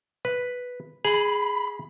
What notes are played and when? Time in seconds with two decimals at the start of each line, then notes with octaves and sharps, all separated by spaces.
0.25 B4
1.05 G#4 B5